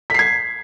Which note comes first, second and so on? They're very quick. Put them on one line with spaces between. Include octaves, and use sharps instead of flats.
B6 C7 G#6